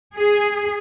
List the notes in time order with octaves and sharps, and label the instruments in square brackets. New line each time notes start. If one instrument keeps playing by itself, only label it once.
[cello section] G#4